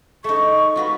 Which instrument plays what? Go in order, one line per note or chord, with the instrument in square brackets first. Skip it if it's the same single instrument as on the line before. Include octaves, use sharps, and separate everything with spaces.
[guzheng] A3 D#4 [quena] C#6
[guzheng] F4 F#4 B4